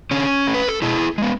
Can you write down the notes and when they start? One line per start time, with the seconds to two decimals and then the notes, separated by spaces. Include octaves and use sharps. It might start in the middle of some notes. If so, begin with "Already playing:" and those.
0.11 D3 C#4
0.47 A3
0.54 B4
0.68 A4
0.82 B2 E4 G#4
1.18 G#3 B3